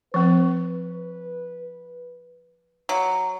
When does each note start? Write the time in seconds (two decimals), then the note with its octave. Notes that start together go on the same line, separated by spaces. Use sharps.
0.14 F3 C4 B4
2.89 F#3